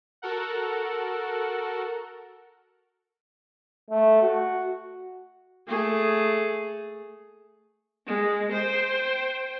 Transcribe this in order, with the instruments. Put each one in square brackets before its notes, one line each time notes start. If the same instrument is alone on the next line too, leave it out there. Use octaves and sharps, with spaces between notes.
[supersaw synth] F#4 A4 A#4 F#5
[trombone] A3
F#4
[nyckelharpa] A3 G#4
[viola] G#3
C5 G5